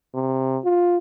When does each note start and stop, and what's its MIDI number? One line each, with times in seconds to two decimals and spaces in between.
0.14 0.58 48
0.64 0.98 65